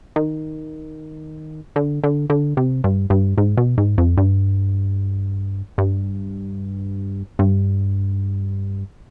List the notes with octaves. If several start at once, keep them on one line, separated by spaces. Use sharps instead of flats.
D#3
D3
D3
D3
C3
G2
G2
G#2
B2
G#2
F2
G2
G2
G2